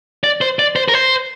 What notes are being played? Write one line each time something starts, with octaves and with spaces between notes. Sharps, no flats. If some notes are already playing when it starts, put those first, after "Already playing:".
D5
C5
D5
C5
A#4
C5